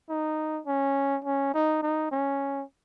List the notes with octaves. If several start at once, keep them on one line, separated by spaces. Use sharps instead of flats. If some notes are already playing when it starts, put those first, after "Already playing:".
D#4
C#4
C#4
D#4
D#4
C#4